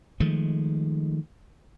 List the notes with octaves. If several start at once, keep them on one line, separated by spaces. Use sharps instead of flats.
D#3 F3 G#3 A3